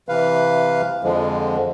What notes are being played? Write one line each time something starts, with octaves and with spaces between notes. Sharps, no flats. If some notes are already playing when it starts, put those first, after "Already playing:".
C3 E3 B4 F5
F2 D3 F3 G#3